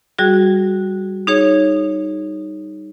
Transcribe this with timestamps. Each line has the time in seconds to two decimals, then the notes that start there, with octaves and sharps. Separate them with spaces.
0.18 G3 F#4 G#4
1.27 D#4 G#4 C#5